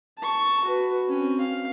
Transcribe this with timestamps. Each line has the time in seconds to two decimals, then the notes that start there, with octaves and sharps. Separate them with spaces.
0.18 A5 C#6
0.64 F#4 B4
1.07 C4 C#4
1.40 F5